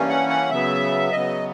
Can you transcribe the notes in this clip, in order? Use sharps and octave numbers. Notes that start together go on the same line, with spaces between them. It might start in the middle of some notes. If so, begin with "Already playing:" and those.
Already playing: G2 E3 G3 A#3 C#4
F#5
F#5
C#3 F#3 B3 E5
C#3 F#3 B3 D#5